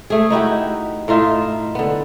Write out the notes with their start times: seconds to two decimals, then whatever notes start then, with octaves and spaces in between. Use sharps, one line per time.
0.10 A3 G#4
0.30 D#4 E4 F#4 G4
1.08 A2 D#4 F4 E5
1.75 D3 B3